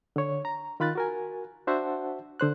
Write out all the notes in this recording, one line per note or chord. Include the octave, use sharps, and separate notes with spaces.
D3 C#5
A#5
D#3 F4 B5 F#6 A6
F#4 A#4 G#5
D4 F#4 C5 E5 F#5 A5
D3 C5 F#6